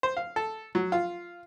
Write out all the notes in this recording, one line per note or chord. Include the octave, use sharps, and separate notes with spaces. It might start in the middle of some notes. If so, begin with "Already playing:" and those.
C5
F5
A4
F#3
F4